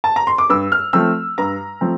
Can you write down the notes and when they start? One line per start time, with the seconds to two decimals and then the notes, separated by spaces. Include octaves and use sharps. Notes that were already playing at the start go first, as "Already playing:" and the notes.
0.04 A5
0.16 A#5
0.27 C6
0.38 D6
0.50 G2 E6
0.72 F6
0.93 F3 A3 C4 E6
1.38 G2 A#5
1.81 F3 A3 C4